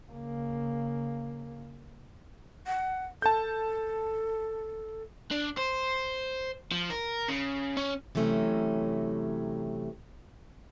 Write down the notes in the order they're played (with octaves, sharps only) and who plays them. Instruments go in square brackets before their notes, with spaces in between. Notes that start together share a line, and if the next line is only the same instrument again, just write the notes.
[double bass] C#3 A#3
[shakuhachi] F#5
[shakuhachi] A4 [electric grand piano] A5 G6
[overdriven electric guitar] D4
C5
F3
A#4
C#3
C#4
[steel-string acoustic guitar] C3 E3 F#3 A3 C#4